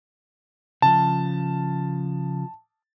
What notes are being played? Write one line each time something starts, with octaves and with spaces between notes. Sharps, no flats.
C#3 F3 A5